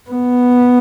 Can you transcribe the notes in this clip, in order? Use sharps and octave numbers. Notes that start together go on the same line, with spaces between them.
B3